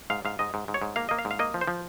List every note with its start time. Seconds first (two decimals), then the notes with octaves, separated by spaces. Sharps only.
0.10 G#2 F5
0.25 G#2 F5
0.39 G#2 D#5
0.54 G#2
0.68 G#2
0.74 C#5
0.82 G#2
0.96 A#3 F5
1.09 A#3 D#5
1.19 F5
1.25 G#2
1.31 F5
1.39 A#3 D#5
1.54 F3
1.61 C5
1.68 F3